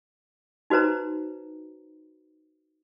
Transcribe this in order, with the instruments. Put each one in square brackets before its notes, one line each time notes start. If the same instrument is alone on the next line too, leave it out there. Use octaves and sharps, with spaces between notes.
[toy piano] D#4 F#4 B4 C5 A#5